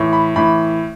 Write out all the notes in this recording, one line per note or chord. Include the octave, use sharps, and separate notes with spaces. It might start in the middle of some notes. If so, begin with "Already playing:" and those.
Already playing: A2 E3
B5
A2 E3 B5